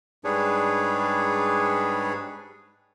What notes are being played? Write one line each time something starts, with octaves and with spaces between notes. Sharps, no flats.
G#2 G3 D4 G#4 B4 C#5